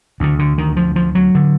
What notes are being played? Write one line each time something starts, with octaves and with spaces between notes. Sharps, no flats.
D2 D3 E3
D3
D#3
F3
F3
F#3
D3